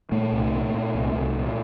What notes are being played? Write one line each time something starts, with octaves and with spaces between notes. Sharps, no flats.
A#2 A3
C2
A#2
A#2
C2
C2
A#2